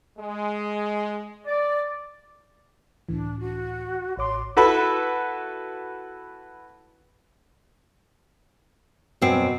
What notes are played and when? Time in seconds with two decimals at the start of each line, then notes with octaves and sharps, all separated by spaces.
0.18 G#3
1.47 D5
3.09 C#2 A2 E3 D4
3.39 F#4
4.17 A1 C#5 C6 D6
4.57 E4 F#4 A4 B4 B5
9.22 F#2 B2 C4